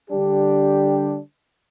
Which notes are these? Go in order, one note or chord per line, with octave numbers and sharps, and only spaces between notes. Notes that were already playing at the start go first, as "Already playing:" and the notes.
D3 G3 D4 G4